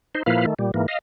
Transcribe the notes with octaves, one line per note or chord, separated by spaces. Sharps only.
D#4 C5
A#2 F3 A#3 E4 B4 F5
D#3 A3
A#2 G3
G#2 E3 A#3
D#5 F5